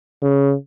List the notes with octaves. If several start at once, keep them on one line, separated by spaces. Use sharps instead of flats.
C#3